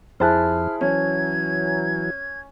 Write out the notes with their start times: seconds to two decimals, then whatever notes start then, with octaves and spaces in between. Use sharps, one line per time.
0.20 F2 E4 G#4 C5 A5 F6 F#6
0.81 E3 F#3 C#4 G#6